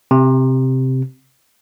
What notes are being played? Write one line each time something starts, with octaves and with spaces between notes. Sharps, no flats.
C3